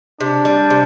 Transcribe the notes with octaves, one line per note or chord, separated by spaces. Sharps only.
C3 D4
G3
C3